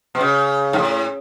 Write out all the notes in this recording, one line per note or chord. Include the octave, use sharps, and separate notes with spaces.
B2
C#3
G#2
A2